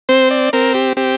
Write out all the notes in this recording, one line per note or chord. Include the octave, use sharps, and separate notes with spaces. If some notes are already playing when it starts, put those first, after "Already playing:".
C4 C5
D5
C4 A#4
G4
C4 G4